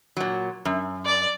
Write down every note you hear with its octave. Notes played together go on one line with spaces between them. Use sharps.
A#2 F#3
F#2
D5